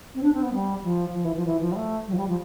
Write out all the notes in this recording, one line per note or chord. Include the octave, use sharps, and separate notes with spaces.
C4
D4
C4
B3
G3
F3
F3
E3
F3
E3
F3
G3
A3
G3
F3
G3
F3